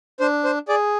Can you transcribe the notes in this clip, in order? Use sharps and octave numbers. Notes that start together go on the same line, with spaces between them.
D4 C5
C5
G#4 D5